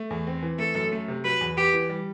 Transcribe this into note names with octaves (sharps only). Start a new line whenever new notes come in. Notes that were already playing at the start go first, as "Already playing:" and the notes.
Already playing: A3
E2
C4
E3
A3 A4
F#2
A3
C3
F#3 B4
E2
B3 G4
E3
G3